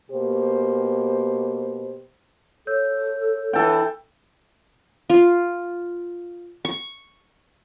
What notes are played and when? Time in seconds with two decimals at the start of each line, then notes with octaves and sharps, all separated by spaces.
0.11 B2 A#3 G4 C5
2.67 A4 C#5 E6 G6
3.53 E3 A4 G5
5.10 F4
6.65 C#6